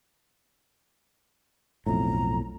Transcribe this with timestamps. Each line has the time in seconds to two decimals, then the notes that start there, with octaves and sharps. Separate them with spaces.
1.86 B1 F2 A2 A#5